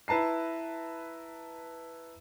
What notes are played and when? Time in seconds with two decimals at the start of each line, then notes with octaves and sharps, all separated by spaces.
0.08 E4 B4 A5 A#5 C7